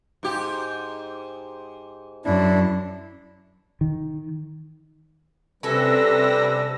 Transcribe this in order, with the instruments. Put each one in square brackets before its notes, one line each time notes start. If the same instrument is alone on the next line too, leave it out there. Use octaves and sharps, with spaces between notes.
[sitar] G#2 G4
[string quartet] F#2 [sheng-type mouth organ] D4 E4
[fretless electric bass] D#3
[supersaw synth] C3 E6 A#6 [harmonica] G3 D4 B4 [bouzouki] C#4 A4